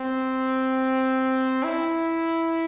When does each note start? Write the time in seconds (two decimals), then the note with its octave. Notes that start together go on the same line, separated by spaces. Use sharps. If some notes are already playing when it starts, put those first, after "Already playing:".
Already playing: C4
1.64 E4